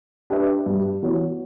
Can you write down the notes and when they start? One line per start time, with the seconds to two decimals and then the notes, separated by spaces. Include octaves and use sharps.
0.30 D4 G4 B4 E5
0.66 G2
1.03 E3 B3 F#4 C#5